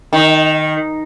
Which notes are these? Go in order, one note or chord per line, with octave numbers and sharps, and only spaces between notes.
D#3